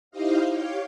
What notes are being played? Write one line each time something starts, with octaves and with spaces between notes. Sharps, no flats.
D#4 E4 G4 C5 D#5 F5
G4 C#5 F5 G5